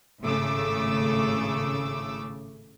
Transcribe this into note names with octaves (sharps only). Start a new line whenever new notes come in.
G#1 A2 C#3 A3 D6 E6